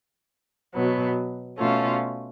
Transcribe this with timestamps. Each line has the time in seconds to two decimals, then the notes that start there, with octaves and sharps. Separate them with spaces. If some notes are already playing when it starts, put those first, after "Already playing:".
0.74 B2 F#3 B3
1.58 B2 A3 C#4 F4